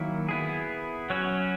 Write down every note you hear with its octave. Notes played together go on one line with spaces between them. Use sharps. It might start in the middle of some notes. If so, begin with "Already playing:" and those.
Already playing: D#3 F#3 A#3 E4
B3 E4 G#4
F#3 C#4 F#4 C#5